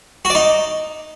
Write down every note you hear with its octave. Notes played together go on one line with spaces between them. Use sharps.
F#4
D5
D#4